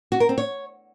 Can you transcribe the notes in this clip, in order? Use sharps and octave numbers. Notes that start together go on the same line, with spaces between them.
F#4
A#4
C4
C#5